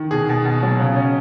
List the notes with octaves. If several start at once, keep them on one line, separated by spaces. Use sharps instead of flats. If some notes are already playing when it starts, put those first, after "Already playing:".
Already playing: D#3
B2 G#4
B2
B2
F#3
C#3
C#4